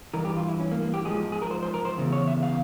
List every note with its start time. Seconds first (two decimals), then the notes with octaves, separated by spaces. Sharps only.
0.14 G2 E3 A#4
0.25 G4
0.37 F4
0.48 E4
0.60 C#4
0.71 A#3
0.82 A#3
0.94 G4
1.05 G#2 F3 G#4
1.32 G#4
1.42 A#4
1.51 C5
1.63 C5
1.74 A#4
1.85 C5
1.98 E2 C#3
2.12 C#5
2.27 E5
2.43 F5